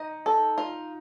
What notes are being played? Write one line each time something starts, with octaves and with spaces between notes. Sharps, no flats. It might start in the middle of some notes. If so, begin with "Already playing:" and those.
Already playing: D#4 D#5
A4
F4